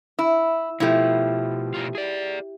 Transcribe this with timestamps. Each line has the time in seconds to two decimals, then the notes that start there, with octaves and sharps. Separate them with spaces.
0.19 E4 E6
0.80 B2 F3 A3 E4 G4
1.74 B2 F4
1.95 G#4 D5